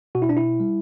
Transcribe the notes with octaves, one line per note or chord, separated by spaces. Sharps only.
B2 F#4
E4
D4
E4
G3